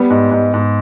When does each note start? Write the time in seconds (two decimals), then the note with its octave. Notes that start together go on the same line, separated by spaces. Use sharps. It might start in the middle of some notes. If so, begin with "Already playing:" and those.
Already playing: G3 B3
0.10 G#2
0.31 G#2
0.54 G#2